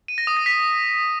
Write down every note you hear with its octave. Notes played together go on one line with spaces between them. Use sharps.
D#7
A#6
D#6
A#6
B6